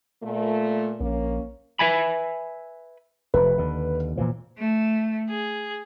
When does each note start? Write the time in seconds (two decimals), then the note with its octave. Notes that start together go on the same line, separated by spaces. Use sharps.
0.23 A#2 A3
1.00 A#1 A#3 C#4
1.79 B4 E5 G#5 B5
3.34 F1 F2 C3 B4
3.58 D#2 D3
4.17 A#2 E3 F3
4.57 A3
5.29 G#4